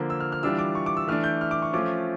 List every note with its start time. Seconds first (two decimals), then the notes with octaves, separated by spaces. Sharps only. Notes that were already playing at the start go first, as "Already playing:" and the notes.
Already playing: D3 F3 A#3
0.10 E6
0.20 F6
0.32 F6
0.43 E3 G3 D4 F4 E6
0.59 D6
0.75 C#6
0.86 D6
0.97 E6
1.08 E3 A3 D4 F6
1.24 G6
1.41 F6
1.51 D6
1.62 C#6
1.73 F3 A3 C#4 F4 D6